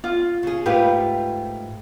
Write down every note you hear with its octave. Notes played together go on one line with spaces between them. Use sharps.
F4
C#3 G#4
G#2 A3 F4 G4 B4